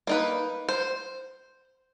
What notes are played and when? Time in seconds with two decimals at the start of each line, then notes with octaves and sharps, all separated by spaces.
0.07 A#3 D#4 B4
0.69 C5